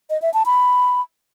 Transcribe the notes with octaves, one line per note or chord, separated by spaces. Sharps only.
D#5
E5
A5
B5